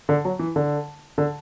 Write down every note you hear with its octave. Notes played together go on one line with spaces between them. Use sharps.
D3
F#3
E3
D3
D3